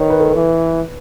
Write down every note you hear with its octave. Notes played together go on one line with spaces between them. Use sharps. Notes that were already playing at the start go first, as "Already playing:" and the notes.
Already playing: D#3 B4 C#5
B4
A4
B4
E3